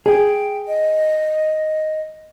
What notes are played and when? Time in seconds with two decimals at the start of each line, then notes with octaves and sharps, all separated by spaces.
0.06 G#4 G5
0.67 D#5